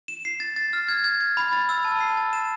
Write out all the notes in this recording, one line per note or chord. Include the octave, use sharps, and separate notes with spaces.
E7
C7
A6
A6
F6
G#6
G#6
G#6
B5
A6
E6
A5
C7
A6
E7